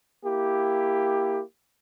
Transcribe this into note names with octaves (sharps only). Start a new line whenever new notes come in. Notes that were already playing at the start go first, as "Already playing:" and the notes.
A#3 E4 G4